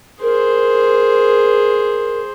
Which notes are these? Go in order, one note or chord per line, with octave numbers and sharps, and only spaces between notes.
G#4 A#4 C5